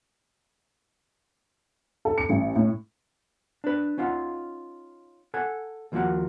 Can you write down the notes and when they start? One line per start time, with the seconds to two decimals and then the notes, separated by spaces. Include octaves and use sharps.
2.05 A4
2.18 C#7
2.29 A1
2.56 A2
3.64 D4 B4
3.98 C#4 D#4 F4 F#5
5.34 A4 F#5 G#5
5.92 D#2 F3 A#3 D#4 F#4 F#5